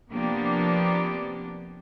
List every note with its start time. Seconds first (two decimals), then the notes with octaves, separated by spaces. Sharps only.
0.11 C3 F3 A#3 B3 D4 G4